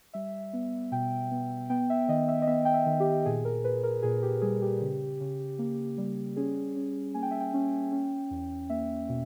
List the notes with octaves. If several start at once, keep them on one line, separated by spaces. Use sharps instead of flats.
G3 E5
B3
B2 G5
B3
B3 G5
E5
D#3 D#5
E5
D#5
B3 E5
G5
E5
D#3
G4
A#2 G#4
A#4
A#2 B4
A#4
A#2 G#4
G4
G3 G#4
G4
C#3
C#3
A#3
G3
C#4 G#4
C#4
A#3 G#5
G5
E5
G5
C#4
C#4
E2
A#3 E5
B2